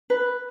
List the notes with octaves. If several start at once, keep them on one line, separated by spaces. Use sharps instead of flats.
B4